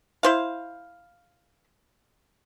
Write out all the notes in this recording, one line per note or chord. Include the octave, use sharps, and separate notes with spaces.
E4 C5 F5